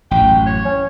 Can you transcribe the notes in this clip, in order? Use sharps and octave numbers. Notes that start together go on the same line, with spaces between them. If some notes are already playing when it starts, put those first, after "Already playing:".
A1 F#2 G5
C#5
C#4